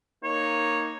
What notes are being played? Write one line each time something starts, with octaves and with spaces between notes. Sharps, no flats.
A#3 D#4 C#5